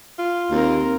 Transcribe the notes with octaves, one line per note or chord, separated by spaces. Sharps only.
F4
D#2 C4 A#4